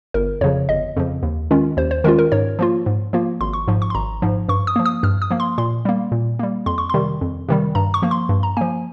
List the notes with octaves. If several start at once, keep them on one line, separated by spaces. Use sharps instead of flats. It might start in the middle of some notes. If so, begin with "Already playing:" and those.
G1 A#4
F2 C#3 F3 C#5
G1 D#5
F2 C#3 F3
D#2
D#3 G#3 C#4 F4
D#2 C5
C5
D#3 G#3 C#4 F4 A#4
A#4
G#2 C#5
F3 A#3 F4
G#2
F3 A#3 F4
G#1 C6
C#6
G#2 F3
C#6
C6
G#1 A#5
G#2 F3
G2 C#6
D#6
F3 A#3
D#6
G2 F6
D#6
F3 A#3
C6
A#2 C6
G3 A#3
A#2
G3 A#3
F2 C6
C#6
C3 D#3 G3 C6
F2
C3 D#3 G3
G2 A#5
C#6
F3 A#3
C6
G2
A#5
F3 A#3 G#5